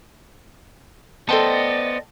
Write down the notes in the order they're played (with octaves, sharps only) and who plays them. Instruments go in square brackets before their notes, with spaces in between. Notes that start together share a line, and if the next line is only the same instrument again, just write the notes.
[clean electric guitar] B3 C5 [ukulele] A4 G5 A5 [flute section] D5 D#5